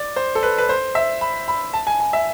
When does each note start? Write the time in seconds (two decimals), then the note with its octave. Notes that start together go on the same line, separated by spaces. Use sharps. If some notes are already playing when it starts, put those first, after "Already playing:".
Already playing: D5
0.16 C5
0.35 A4
0.43 B4
0.58 B4
0.69 C5
0.95 E5
1.21 B5
1.48 B5
1.74 A5
1.87 G#5
2.00 G#5
2.13 E5